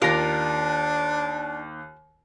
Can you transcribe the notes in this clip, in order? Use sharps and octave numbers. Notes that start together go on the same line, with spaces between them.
D#2 D4 F4 G4 A#4 A#6